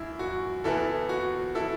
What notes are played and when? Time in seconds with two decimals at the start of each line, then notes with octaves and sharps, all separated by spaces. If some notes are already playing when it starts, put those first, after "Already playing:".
Already playing: F#2 E4
0.19 F#4
0.64 E2 E3 B3 E4 A4
1.09 F#4
1.55 E4 A4